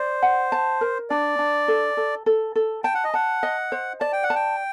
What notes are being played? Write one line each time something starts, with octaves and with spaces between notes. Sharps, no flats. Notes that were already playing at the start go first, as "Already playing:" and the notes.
Already playing: C5 D5
F#5
A5
A#4
D4 D5
D4
A4
A4
A4
A4
G5 A5
F#5
D#5
F#5 A5
D#5
C5
D5 A5
G5
F#5
A5
G5